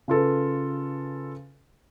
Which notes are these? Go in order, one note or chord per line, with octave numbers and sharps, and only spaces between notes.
C#3 F4 A4 B4